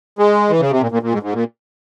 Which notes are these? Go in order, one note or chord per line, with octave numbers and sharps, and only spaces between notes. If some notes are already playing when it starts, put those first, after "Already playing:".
G#3
E3
C#3
C3
A#2
A#2
A#2
G#2
G#2
A#2